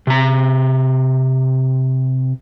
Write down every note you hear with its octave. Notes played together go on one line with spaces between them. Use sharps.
C3 A#5